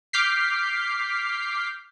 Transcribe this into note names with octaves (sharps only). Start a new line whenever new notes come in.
D6 F6 G6 B6 C7